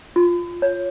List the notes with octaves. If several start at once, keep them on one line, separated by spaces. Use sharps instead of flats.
F4
C#5